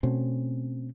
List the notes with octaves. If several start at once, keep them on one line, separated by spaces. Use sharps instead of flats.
B2 A3 C4 C#4